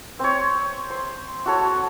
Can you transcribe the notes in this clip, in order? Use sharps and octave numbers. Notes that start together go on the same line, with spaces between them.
C4 C#5
C5
F#4 A4 C#5